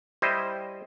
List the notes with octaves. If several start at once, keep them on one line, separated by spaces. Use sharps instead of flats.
G3 E4 C5 D#5